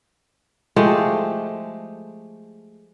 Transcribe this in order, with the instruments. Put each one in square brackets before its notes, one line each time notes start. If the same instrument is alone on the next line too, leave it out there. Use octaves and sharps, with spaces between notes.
[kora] F3 G#3 A3 G4